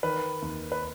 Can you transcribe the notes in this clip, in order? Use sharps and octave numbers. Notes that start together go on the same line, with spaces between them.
D#3 B4
D#2
B4